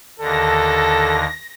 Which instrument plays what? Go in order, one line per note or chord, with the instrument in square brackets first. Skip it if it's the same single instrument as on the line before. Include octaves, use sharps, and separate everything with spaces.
[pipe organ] D#2 D3 [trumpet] A4 [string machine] A#6